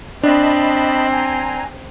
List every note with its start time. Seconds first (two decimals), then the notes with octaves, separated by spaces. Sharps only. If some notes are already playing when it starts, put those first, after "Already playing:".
0.23 C4 D4 D#5 A5 B5
1.12 G#5 A#5